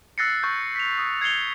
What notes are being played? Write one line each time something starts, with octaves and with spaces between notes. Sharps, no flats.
E6 F#6 A6 A#6 C7 C#7
C#6 G6
B6 F7
D#6
G#6 C7 C#7 F7 G7